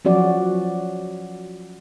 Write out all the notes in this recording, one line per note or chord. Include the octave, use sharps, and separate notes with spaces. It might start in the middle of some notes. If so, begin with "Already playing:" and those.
F3 F#3 C#4 F#4 D5